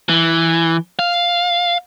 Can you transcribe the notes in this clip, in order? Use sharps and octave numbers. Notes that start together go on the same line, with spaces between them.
E3
F5